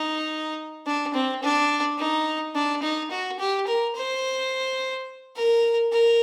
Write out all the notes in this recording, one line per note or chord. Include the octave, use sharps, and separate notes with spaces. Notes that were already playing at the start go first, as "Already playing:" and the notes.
Already playing: D#4
D4
C4
D4
D#4
D4
D#4
F#4
G4
A#4
C5
A#4
A#4